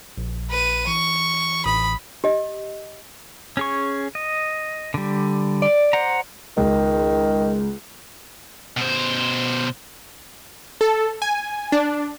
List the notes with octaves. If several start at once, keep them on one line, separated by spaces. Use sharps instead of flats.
A#1
B4 D#7
E3 C#6
A1 B5 D#6
G4 D#5
C#4 G#4 C#6
D#5
D3 G3
D5
C5 F#5 A#5
C#2 D#3
B2 C5
A4
G#5
D4